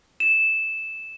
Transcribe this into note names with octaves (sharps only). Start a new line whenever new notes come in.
E7